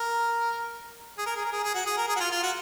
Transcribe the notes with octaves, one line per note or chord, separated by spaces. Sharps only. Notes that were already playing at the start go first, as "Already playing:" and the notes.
Already playing: A#4
G#4
A#4
G#4
A#4
G#4
G#4
F#4
G#4
A#4
G#4
F#4
F4
F4
F#4